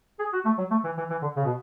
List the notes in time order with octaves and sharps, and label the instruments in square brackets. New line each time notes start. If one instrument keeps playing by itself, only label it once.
[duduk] G#4
F#4
A3
F#3
A3
E3
E3
E3
D3
C#3
B2